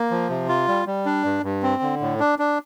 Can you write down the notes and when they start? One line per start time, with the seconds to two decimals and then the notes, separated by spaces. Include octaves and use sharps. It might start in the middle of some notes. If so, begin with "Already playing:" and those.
Already playing: A#3
0.11 F3
0.30 C3
0.49 F4
0.68 G3
0.87 G3
1.06 D4
1.25 G2
1.44 G2
1.63 C4
1.82 D3
2.01 A2
2.20 D4
2.39 D4